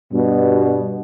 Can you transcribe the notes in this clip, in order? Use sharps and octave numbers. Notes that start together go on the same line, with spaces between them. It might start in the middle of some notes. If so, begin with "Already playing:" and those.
G2 B2